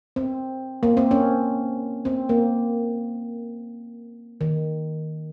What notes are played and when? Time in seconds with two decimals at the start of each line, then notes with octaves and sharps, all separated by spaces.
0.16 C4
0.83 A#3
0.97 C4
1.11 C#4
2.05 C4
2.29 A#3
4.41 D#3